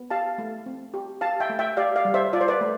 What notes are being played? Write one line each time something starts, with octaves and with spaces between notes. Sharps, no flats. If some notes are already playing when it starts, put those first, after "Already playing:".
Already playing: B3
G4 F5 A5
A3
C4
G4
G4 F5 A5
E5 G5
A3
E5 G5
G4 D5 F5
D5 F5
G3
C5 E5
F4 D5
C5
B4 D5
A3